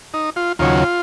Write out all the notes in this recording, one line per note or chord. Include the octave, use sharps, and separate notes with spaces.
D#4
F4
D#2 C#3 F#3 F4